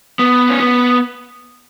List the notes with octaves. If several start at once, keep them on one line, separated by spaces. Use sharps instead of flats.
B3
C#4
B3